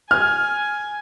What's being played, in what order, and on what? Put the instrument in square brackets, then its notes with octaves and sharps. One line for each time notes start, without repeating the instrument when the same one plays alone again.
[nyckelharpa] G#5 [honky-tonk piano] F6